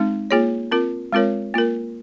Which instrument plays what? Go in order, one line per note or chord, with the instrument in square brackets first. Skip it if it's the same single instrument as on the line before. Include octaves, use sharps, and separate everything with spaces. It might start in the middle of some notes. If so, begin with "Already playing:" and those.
Already playing: [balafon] G#3 C4 D#4
A#3 F4 G#4 C#5
C4 F4 A#4
G#3 C4 F4 A#4 C#5
A#3 F4 A#4